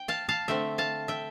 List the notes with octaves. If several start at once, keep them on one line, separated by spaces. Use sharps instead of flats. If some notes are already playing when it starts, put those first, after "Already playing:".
Already playing: G5
F5 A5
F5 A5
D3 A3 C4 E5 G5
F5 A5
E5 G5